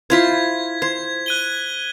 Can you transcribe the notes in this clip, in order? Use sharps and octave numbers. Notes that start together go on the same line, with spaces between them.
E4 F4 C5 G#6 B6
C5 G#6
F#6 D#7 G7